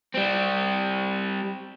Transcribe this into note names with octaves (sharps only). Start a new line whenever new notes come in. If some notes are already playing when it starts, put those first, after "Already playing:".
G3 C4